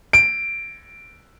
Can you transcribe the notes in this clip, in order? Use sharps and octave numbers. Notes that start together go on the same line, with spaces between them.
D7